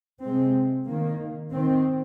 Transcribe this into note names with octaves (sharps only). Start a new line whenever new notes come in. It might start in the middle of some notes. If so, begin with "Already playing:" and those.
C3 G#3 C4
D#3 A#3
D#3 C4